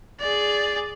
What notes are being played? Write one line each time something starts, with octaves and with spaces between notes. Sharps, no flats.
G#4 D5